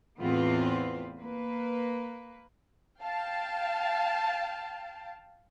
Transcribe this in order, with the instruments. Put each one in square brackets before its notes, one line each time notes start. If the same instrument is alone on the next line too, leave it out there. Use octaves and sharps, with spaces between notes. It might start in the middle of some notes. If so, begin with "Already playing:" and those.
[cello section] E2 A2 B3 C4 F4 B4
A#3 B4
[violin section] F5 G5 A5